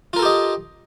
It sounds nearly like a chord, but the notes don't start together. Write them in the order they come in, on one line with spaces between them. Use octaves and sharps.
F4 A#4 A4 G4 D#5